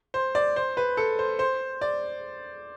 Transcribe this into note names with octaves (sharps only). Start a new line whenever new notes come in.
C5
D5
C5
B4
A4
C5
C5
D5